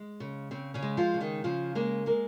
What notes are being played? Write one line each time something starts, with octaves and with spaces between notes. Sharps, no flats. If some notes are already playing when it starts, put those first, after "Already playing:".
Already playing: G#3
C#3
C#3 C4
C#3 C#4
G#3
F3 F4
C#3
D#3 D#4
C#3 F3 F4
G#3 A#3 A#4
G#3 A#3 A#4